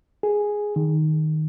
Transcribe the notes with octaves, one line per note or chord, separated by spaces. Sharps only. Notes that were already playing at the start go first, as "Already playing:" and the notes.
G#4
D#3